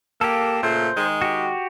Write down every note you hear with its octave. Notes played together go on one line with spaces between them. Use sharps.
A#3 G4 A4
A#2 C#3 A3 C5
D#3 G#3
F#4 G4